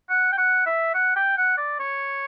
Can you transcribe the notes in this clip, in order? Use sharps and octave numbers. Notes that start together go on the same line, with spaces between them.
F#5
G5
F#5
E5
F#5
G5
F#5
D5
C#5